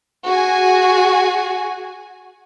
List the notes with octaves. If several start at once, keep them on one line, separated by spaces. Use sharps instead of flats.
F#4 G#4 G#5